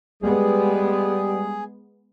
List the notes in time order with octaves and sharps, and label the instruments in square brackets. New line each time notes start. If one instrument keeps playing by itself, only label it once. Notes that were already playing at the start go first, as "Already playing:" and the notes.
[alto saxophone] G3 [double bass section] G#3 B3 [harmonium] G#4